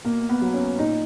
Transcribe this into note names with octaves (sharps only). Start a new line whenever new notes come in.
B2 A#3
B3
F#3
C#4
A#2 D#4